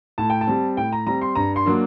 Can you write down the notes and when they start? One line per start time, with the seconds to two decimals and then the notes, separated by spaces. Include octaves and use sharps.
0.18 A2 A5
0.30 G5
0.41 A5
0.47 G3 C4
0.77 A2 G5
0.92 A#5
1.07 G3 C4 A#5
1.21 C6
1.35 G2 A#5
1.56 C6
1.65 F#3 A#3 D4